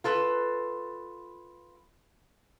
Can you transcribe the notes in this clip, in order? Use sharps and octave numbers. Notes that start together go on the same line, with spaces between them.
F4 A4 B4